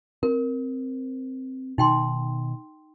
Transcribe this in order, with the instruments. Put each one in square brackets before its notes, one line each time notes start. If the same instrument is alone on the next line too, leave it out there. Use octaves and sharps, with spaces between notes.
[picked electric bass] C4 [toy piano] A#4
[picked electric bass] B2 D#3 [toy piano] D#4 G5 C6